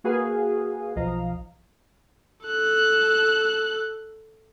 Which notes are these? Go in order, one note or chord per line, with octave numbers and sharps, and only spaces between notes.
A#3 F#4 G#4 B4 F5 G#5
B1 F3 D#5 F5 A#5
A4 F#6